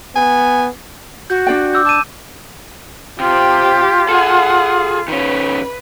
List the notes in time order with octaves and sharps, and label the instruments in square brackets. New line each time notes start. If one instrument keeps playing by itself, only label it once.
[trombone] B3 [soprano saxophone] G#5
[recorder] F#4 [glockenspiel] G6
[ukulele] D4 D5 G5
[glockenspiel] D6 E6 G6
[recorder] A5 [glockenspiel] D6 D#7
[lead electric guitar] C3 [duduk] F4 [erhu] G4
[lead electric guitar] G#4 A4 [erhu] F#5
[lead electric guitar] D#3 C#4 [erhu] B4